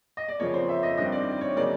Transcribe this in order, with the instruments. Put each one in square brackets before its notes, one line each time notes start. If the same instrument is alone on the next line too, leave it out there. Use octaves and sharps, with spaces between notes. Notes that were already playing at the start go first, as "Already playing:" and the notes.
[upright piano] D#5
D5
F2 C#3 F3 A#3 C#5
C5
E5
D#5
G2 D#3 G3 C4 D#5
D5
C#5
C#3 F#3 A#3 D#4 D5